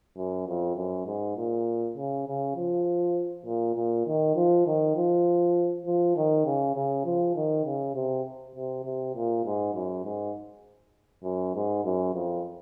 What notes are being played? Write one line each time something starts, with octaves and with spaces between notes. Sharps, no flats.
F#2
F2
F#2
G#2
A#2
C#3
C#3
F3
A#2
A#2
D#3
F3
D#3
F3
F3
D#3
C#3
C#3
F3
D#3
C#3
C3
C3
C3
A#2
G#2
F#2
G#2
F#2
G#2
F#2
F2